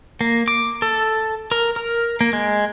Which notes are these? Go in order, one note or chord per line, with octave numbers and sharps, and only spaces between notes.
A#3
D6
A4
A#4
A#4
A#3
G#3